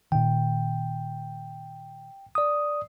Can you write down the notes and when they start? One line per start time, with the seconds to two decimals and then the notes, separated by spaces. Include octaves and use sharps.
0.12 A#2 D#3 G5
2.35 D5 D#6